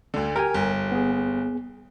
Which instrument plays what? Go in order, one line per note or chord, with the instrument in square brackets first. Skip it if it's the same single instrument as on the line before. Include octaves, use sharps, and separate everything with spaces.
[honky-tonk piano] D2 D3
[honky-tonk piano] G4 [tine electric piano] A#4 G#5
[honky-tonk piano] G1
[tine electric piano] B3 G#4